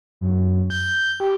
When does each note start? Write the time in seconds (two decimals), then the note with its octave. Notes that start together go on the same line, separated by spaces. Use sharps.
0.21 F#2
0.70 G6
1.20 G4